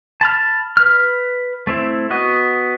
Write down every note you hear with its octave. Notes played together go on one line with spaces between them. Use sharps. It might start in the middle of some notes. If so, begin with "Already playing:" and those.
A5 B5 F6
B4 F6
A3 C4 E4
B3 F#4 D#5